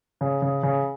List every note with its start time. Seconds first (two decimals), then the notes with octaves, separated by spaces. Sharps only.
0.21 C#3
0.42 C#3
0.63 C#3